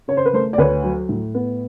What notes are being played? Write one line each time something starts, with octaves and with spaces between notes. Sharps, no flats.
C#3 C#5
C5
B4
A3 A#4 C5
D5
D2 B4 C#5
F#3
A2
B3